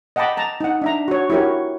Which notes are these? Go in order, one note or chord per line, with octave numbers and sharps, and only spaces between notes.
D#5 F#5 G5 A5 B5 D6
A5 A#5
D#4 F#5
D4 E5 A#5
F#4 C#5
E4 F#4 G4 A#4 C#5